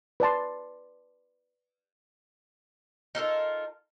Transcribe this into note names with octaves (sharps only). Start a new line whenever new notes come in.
B4 D5 A5 C6
D#4 F4 A4 A#4